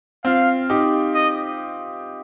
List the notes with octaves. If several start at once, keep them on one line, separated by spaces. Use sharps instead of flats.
C4 F4 F5
D#4 G4
D#5